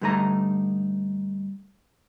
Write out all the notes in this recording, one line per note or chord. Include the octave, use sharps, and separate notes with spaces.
G2 D3 A3 D#4 A#5